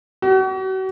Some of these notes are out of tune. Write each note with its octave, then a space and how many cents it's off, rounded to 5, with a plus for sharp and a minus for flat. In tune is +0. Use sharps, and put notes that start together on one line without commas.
F#4 +40